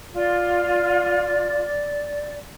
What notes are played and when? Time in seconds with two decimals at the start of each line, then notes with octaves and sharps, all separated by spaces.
0.14 F4 D5